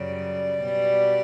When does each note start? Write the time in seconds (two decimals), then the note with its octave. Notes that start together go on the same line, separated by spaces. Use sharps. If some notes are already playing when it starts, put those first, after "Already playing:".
Already playing: F#2 C#3 G3 D5
0.61 B2 G3